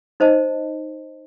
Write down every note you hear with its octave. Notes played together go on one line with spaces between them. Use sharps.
D#4 C5 D#5 A5